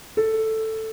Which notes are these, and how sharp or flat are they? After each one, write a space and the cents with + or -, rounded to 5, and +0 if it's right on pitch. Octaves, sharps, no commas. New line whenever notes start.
A4 +5